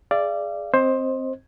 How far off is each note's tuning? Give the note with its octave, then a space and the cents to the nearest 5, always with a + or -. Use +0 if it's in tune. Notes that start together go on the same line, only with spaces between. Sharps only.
G#4 +0 D5 +0 F5 -40
C4 +0 C5 +15 D#5 +0